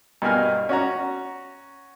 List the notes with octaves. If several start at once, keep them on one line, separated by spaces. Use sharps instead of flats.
G2 B2 A#3 G#5 F6
C#4 F#4 A#5